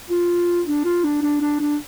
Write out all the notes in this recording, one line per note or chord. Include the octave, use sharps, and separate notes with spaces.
F4
D4
F4
D4
D4
D4
D4